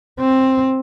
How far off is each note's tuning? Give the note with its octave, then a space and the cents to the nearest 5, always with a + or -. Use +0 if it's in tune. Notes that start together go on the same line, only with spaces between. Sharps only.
C4 +10